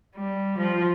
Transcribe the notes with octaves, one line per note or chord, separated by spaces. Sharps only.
G3
F3